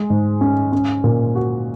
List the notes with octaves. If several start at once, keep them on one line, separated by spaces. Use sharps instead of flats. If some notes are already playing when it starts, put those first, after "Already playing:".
Already playing: G#3
G#2
C#4
C#4
A#2
F#4